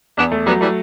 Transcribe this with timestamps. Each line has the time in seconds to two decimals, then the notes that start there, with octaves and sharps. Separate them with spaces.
0.17 E2 B3 D4
0.32 A3
0.46 F#3 G3 B3
0.61 E3 G3 A3